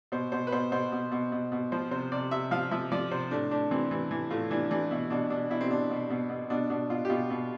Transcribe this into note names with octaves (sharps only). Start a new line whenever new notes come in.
B2 C5
B2 C5
B4
B2 C5
B2 C5
B2
B2
B2
B2
F3 C5
C3 C5
C3 D5
C3 E5
F3 F5
F3 E5
F3 D5
C3 C5
A2 D4
A2 D4
E3 C4
E3
E3
A2 F4
E3 D4
E3 D4
B2 E4
B2 D4
B2 D4
B2 E4
C4
B2 D4
B2
B2
B2
B2 D4
B2 D4
B2 F4
G4
B2 F4
B2